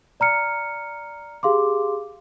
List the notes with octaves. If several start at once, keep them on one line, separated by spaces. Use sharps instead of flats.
D5 A#5 F6 C#7
G4 G#4 F5 C6 D6